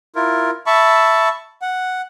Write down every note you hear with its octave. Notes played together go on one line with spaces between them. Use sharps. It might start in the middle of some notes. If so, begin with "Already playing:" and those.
E4 F4 A#4
E5 A5 B5 C#6
F#5